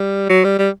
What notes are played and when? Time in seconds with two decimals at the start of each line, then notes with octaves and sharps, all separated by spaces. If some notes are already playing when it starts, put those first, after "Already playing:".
Already playing: G3
0.29 F#3
0.45 G3
0.59 G3